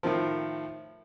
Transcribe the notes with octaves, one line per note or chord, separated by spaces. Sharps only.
A2 D#3 F3